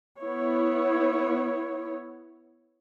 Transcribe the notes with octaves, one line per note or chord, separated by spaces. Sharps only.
B3 E4 C#5